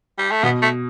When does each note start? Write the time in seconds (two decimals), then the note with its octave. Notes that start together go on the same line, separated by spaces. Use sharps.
0.19 G3
0.31 A3
0.43 B2 B3
0.62 A3